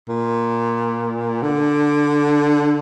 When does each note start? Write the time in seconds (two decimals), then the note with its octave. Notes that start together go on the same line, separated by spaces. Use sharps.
0.08 A#2
1.42 D3